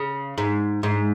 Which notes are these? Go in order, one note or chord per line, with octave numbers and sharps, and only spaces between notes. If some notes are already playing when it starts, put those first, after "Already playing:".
Already playing: C#3
G#2
G#2